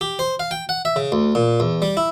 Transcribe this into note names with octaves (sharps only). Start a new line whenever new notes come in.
G4
C5
F5
G5
F#5
E5
C#3
D2
A#2
E2
G3
E4